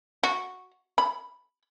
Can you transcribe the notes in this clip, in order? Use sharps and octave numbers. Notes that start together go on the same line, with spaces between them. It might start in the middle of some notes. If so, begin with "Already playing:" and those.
F#4
B5